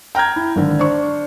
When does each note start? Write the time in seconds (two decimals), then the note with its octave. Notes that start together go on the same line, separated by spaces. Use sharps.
0.15 G5 A#5 F6 G6 G#6
0.36 E4
0.56 G#1 D3
0.79 D4 C5 C#6